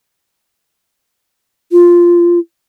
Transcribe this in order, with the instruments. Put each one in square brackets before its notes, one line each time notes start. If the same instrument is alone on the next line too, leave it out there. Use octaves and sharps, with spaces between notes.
[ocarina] F4